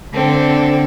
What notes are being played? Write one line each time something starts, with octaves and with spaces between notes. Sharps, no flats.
D3 C4 A4